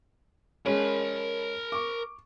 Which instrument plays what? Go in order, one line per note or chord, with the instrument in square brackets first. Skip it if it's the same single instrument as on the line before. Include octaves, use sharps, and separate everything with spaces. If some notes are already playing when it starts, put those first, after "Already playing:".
[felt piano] G#3 C#4 [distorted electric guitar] A#4 B5
[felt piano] C#6 D6